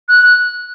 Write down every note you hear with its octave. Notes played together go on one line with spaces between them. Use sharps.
F#6